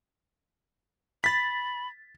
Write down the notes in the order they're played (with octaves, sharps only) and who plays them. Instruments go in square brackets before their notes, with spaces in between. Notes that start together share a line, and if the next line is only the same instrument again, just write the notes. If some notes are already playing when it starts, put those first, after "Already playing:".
[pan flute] B5 [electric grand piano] A6 B6